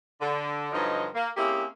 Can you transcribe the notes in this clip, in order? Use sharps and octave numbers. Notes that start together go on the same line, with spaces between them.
D3
G2 D3 F3 F#3 D#4
A#3
A#3 C4 C#4 E4 G4 G#4